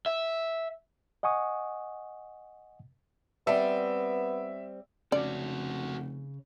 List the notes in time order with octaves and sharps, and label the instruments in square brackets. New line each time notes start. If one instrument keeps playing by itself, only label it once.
[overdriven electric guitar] E5
[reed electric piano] D#5 F#5 G#5 C#6 D#6
[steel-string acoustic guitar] G3 C4 [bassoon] B3 [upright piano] E5
[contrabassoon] F1 [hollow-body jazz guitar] C#3 C#4 [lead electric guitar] F#4 A4 [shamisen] D5